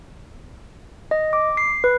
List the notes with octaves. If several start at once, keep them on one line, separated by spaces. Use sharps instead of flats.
D#5
D6
C7
B4